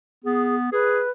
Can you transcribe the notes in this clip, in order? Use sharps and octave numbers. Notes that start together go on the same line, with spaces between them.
B3 G#4
G#4 B4